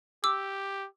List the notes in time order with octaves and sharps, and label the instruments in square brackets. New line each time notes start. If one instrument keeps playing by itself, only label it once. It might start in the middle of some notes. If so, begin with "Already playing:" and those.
[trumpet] G4 [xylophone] D6 E6